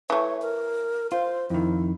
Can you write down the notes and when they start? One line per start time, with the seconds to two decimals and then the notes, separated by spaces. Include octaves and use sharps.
0.10 E3 A3 C#5
0.42 A#4
1.12 F4 C5
1.50 F2 D#3 E4